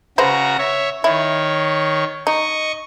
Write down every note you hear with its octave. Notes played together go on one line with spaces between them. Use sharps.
C#3 G#3 F#4 B4 C5 A#5
C#5 E5
D#3 E4 C#5
D#4 D#5 C#6